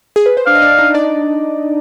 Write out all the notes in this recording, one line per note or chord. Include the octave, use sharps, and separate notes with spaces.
G#4
B4
C5
D4 D5 F5
D#5
D4 D5
D#4 D#5
D4 D5